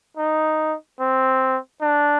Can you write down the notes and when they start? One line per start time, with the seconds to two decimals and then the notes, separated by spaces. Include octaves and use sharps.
0.17 D#4
1.00 C4
1.82 D4